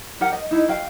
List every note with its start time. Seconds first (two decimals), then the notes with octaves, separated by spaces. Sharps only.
0.21 G4 A#4 F#5
0.32 D#5
0.51 D#4 E4
0.68 F#4 F5 G5